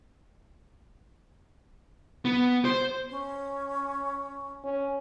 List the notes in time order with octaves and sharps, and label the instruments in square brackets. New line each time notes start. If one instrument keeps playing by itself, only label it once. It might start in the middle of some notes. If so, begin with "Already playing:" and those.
[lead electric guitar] B3
C5
[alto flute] C#4
[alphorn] C#4